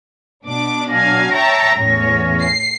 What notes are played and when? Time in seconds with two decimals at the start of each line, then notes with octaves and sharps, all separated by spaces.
0.45 B2 D4 D6
0.89 F#3 F5 G#5 A#6
1.31 C#5 E5 G5 A5 A#5
1.76 E2 A2 C#4 C#5
2.41 C7